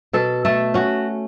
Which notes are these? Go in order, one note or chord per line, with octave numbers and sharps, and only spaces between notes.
B2 A4
A3 A4
C#4 F#4